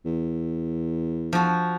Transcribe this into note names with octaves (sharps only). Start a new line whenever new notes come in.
E2
F3 F#4